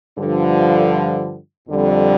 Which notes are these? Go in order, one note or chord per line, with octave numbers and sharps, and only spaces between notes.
G2 D3 F3
F2 D3 G3